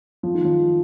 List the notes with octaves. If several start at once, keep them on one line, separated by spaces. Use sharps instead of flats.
F3
D#3
F3